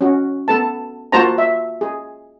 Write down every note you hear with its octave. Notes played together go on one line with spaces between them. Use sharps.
C#4 F#4
B3 A4 B4 A5
A#3 F4 F#4 C5 A5 A#5
E5
G#4